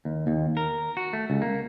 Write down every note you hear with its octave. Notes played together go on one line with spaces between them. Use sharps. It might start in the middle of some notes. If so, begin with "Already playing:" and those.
D#2
D#2
A#4
F#4
A3
C#2
A#3